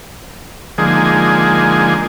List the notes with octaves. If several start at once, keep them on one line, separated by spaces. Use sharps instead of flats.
D3 F3 G#3 A#3 D#4 G#4